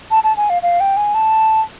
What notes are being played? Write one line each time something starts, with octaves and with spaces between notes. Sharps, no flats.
A5
A5
G#5
F5
F5
G5
G#5
A5